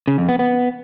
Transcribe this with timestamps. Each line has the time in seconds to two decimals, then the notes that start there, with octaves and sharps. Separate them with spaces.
0.08 C#3
0.18 F2
0.29 B3
0.39 B3